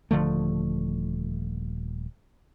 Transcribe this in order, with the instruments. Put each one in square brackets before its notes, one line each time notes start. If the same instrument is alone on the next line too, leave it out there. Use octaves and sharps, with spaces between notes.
[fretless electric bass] D#1 D3 F3 A3